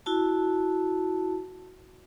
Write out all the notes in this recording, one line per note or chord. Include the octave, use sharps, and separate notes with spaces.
E4 F#4 A5